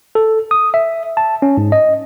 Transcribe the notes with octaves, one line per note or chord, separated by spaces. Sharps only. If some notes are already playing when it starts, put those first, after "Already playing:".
A4
D#6
E5
A5
C#4
G#2
D#5